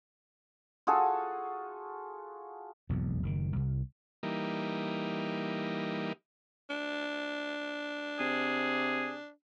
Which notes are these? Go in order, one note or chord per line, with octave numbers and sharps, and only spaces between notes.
F4 F#4 G#4 A4
E1 B1 F2
F#1 A2 D#3
C2
E3 G3 A#3 D#4
D4
C3 G#4